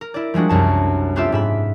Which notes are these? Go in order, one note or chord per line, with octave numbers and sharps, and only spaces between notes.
A#4
E4 D5
F3 G3 G#3 D4 F#4
C2 F#2 A5
B3 C4 F4 G4 A4 E5
G#2 E5 B5